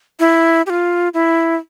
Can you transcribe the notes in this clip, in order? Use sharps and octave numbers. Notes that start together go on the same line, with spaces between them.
E4
G4
F4
E4